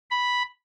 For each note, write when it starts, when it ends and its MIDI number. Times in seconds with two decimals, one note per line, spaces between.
0.11 0.42 83